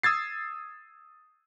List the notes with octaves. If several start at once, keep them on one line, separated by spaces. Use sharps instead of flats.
D#6 E6 G#6 A6 C7